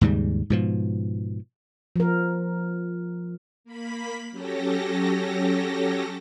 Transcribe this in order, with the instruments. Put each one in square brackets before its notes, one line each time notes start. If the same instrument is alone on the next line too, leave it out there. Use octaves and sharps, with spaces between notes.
[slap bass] D#2 G#2 C#3 G3
G#2 B2 F3
[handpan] F3 A#4
[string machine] A#3 B5 B6
F#3 C#4 G4 A4 A#6